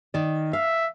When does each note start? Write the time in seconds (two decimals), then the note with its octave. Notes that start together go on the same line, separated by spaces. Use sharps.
0.14 D#3 D5
0.53 E5 F5